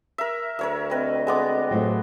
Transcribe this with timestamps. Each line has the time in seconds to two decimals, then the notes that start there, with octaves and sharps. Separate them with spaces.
0.18 A#4 E5
0.59 D2 A#4 C#5 E5
0.91 C4 B4 D#5
1.27 G#3 B3 D6
1.71 F2 A2 F#3